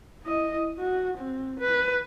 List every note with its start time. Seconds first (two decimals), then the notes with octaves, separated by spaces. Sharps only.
0.22 E4 D#5
0.78 F#4
1.17 C4
1.59 B4